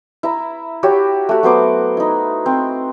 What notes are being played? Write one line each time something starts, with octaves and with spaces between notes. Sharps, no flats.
E4 E5 A#5
F#4 G4 C#5 E5
A3 F#4
F#3 B3 C5 D6
D#4 E4
C4